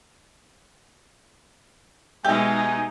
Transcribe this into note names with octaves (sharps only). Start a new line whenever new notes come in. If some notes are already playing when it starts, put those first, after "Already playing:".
B2 G#3 D#4 G4 E5 G#5 G6